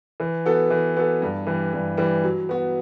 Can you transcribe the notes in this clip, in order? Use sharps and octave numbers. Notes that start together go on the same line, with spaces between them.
E3
B3 F#4 A4
E3
B3 F#4 A4
G2
E3 G3
G2
E3 G3
F#3
B3 F#4